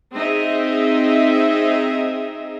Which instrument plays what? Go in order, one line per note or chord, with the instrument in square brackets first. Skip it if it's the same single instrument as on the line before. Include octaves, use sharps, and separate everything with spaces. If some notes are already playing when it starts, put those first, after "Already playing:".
[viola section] C4 D#4 G#4 D#5 E5